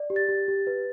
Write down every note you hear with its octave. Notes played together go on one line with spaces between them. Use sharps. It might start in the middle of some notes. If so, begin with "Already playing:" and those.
Already playing: D5
G4
A6
G4
G4
B4